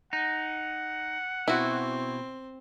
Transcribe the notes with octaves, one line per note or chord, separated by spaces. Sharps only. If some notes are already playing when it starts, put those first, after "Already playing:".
D#4 F#5
B2 C4 E4 F#4